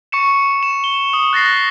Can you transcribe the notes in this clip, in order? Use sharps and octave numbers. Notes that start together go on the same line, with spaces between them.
C#6 C#7 E7
E7
G7
D#6
F#6 A6 A#6 C7